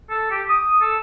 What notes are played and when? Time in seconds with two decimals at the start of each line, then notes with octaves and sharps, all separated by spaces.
0.10 A4
0.31 G4
0.49 D#6
0.81 A4